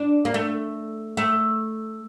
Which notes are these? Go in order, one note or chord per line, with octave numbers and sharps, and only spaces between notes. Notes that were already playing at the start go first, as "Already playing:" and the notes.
Already playing: D4
A#3
A3
A3